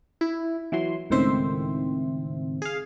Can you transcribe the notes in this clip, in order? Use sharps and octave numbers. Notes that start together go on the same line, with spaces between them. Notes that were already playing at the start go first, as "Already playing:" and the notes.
E4
E3 F#3 C6
C#2 A2 D#3 C4 C5 E5
G#4 F5